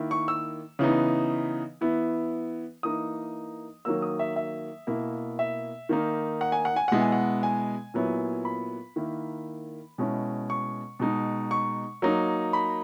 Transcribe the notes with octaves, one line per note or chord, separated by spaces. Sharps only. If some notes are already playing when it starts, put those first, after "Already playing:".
Already playing: D#3 A#3 E4
C#6
E6
C#3 E3 B3 D#4
E3 B3 E4
E3 A#3 D#4 D#6
D#3 F#3 A#3 E6
D#6
E5
E5
B2 A#3 E4
E5
D#3 A#3 D#4
F#5
G#5
F#5
G#5
B2 G#3 B3 E4 F#5
G#5
F#5
G#5
A#2 F#3 B3 E4
B5
D#3 A#3 E4
B2 G#3 C#4 E4
C#6
B2 G#3 D#4
C#6
F#3 A#3 D#4
B5